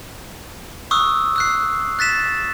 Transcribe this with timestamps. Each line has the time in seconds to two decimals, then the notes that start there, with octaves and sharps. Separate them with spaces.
0.91 C#6 D#6 E6 F#6
1.36 E6 F#6 C7
1.99 F#6 A6 B6 E7